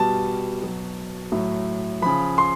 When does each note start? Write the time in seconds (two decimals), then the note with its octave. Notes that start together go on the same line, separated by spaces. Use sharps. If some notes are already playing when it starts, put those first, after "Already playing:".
Already playing: B2 G3 A5
0.62 B2 F#3
1.32 A2 F#3
2.02 C#3 F3 B5
2.38 C6